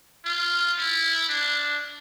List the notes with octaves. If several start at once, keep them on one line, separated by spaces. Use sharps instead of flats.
F4
E4
D4